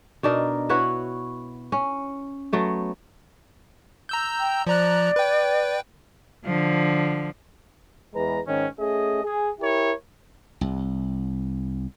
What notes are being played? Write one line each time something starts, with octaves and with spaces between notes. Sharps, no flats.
B2 D4 D#4 A#4
E4 F#4 B4 C#5
C#4
F#3 A3 B3
A#5 E6 G6
G5
F3 D5 A#5 F#6
B4 G5
D3 F3
E2 G#3 B4 A#5
G#2 D#3 C#4
A3 C#4 G#4 D#5
G#4
E4 G4 A#4 C#5
C2